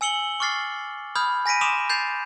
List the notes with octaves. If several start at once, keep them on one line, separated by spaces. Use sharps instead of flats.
G#5 E6 C#7 F#7 G7
C#6 D6 F6 A6 C7
B5 D#6 F6 G6 G#6
G#5 A#6 B6 D7 D#7
C6 D6 D#6 D7 E7 F7
G6 A6 C7 F7